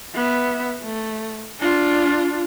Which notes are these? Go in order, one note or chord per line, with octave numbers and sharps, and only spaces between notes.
B3 E5
A3
D4 F4